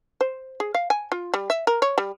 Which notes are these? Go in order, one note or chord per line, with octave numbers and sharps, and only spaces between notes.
C5
G#4
F5
G#5
F4
G3
E5
A#4
C#5
G3